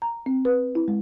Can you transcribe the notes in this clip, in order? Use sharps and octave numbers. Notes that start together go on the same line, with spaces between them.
A#5
C4
B4
E4
G#3